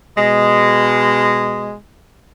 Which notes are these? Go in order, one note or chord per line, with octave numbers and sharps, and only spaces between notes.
B2 G#3